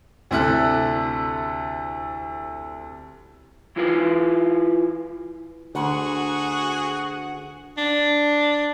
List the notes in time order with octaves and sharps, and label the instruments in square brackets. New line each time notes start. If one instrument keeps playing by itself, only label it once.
[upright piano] D2 C3 E4 A4 F#6
[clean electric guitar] E3 E4 F4 G4 B4 F5
[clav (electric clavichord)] D2 [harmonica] F#4 G#4 [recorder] F#5
[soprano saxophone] D4